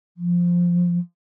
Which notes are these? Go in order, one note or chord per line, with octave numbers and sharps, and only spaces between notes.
F3